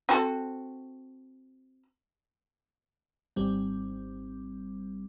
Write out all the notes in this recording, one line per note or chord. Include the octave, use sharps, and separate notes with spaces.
C4 F#4 A4
G#1 G3 C4